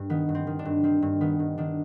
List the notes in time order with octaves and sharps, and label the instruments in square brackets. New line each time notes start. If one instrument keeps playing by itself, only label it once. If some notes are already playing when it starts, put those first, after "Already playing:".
Already playing: [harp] G2
D#3 B3
G2
C4
D#3
D4
G2
D#3 C4
G2
D#3 B3
G2
D#3 D4